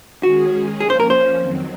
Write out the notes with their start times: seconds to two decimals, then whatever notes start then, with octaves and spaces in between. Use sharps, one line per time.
0.23 D#3 G#3 C#4 F#4 G#4
0.80 F3 A#3 C#4 G#4
0.90 C5
1.00 A#4
1.10 C5
1.39 F2 D#3 F#3 C4